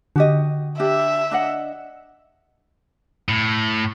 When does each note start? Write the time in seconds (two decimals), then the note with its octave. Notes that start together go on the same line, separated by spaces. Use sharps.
0.16 D3 F#4 G4 D#5
0.80 D4 G4 E5
1.31 D4 D#5 F#5
3.29 A2